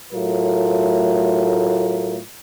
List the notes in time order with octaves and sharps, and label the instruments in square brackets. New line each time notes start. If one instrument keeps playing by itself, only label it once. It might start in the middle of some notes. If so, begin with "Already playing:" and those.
[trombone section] A2 F#3 A3 F4 A#4